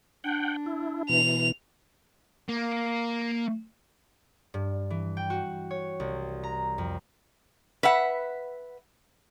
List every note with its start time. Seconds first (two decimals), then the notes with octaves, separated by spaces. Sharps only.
0.24 D4 F#5 G5
0.66 E4
1.09 B2 E3 F7
2.48 A#3
4.54 G2
4.90 E3
5.17 G5
5.30 F#4
5.71 C#5
6.00 C2
6.43 A#5
6.78 F2
7.83 B4 E5 F#5